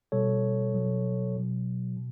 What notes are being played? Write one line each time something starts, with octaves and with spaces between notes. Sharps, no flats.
B2 G3 A4 C#5
B2 F#3
B2 F#3
B2